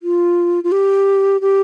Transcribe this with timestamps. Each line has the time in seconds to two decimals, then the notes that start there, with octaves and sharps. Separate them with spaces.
0.03 F4
0.64 F4
0.72 G4
1.41 G4